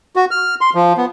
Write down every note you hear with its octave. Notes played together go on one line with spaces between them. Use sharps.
F#4
F6
C6
F3
B3